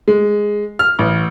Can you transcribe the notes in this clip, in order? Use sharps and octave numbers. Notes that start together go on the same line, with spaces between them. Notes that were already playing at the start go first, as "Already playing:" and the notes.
G#3
F6
A1